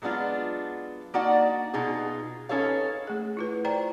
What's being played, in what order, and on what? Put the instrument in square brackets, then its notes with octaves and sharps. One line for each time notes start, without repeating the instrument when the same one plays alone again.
[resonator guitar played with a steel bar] F#3 G#3 B3 D4 F4
A#3 D4 D#4 F#4 D5 F#5
B2 D#4 F4 G#4
C#4 D#4 A4 B4 C#5 F5
[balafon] A3 G#4
E4 F4 B4
C5 D5 G5 A#5